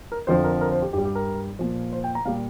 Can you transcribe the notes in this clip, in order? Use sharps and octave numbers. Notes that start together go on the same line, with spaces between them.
A#4
F2 D3 F3 C5
A#4
A#4
C5
G4
G2 G3 G4
G4
A#4
A#2 F3
C5
G5
A#5
A#2 G3 F5